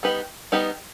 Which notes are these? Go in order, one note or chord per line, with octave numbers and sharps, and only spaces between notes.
G3 B3 D#4 G4 B4
G3 B3 D#4 G4 B4